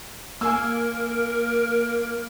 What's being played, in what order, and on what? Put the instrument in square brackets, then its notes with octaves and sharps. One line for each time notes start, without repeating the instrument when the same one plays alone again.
[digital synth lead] A#3 [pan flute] A#4 [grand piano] G#5 E6